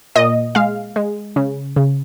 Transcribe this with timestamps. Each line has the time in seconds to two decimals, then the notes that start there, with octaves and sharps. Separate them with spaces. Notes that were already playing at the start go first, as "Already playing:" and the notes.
0.15 A#2 D#5
0.55 G#3 F5
0.96 G#3
1.36 C#3
1.76 C#3